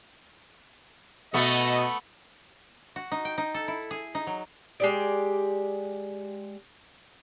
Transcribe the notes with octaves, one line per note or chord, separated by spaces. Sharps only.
B2 A3 B3 D#5
F#4
D#4
G5
D#4
A4
E4
G#4
D#4
F#3
G#3 G4 D5